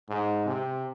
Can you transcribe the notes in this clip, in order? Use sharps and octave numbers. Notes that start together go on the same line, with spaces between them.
G#2
C3